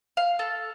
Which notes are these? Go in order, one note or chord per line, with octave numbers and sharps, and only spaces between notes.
F5
A4